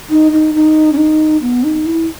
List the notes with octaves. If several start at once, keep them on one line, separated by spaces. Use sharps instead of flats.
D#4
D#4
D#4
C#4
D#4
B3
D#4
E4